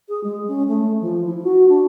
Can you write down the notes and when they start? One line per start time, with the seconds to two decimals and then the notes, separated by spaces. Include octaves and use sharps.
0.09 G#4
0.24 G#3
0.48 C#4
0.68 A3
1.01 F3
1.25 E4
1.43 F#4
1.69 D4